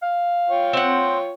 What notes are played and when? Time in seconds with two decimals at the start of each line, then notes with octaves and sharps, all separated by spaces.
0.02 F5
0.49 F4 C#5 G5
0.73 C4 F#5